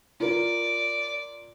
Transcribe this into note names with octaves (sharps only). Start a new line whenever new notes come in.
F4 A#4 D5